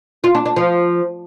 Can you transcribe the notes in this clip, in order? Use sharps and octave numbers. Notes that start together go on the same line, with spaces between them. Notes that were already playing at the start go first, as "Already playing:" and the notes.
F4
D4
D4
F3